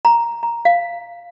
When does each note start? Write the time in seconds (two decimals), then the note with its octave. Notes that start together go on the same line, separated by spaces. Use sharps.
0.05 A#5
0.43 A#5
0.65 F5